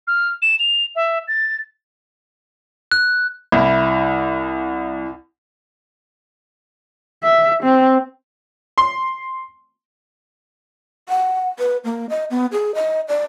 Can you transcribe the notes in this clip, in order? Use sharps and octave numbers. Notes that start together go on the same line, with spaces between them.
F6
E7
F7
E5
A6
F#6
C2 E4
E5
C4
C6
F#5
B4
A#3
D#5
B3
G#4
D#5
D5